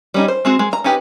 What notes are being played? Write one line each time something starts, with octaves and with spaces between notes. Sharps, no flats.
G3 C#4 D#4
C5
G#3 C4 F#4
G#3
A#5
C#4 D#4 G4 B4